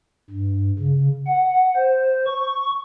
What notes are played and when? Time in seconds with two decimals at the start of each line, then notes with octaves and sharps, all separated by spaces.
0.30 G2
0.79 C#3
1.26 F#5
1.76 C5
2.26 C#6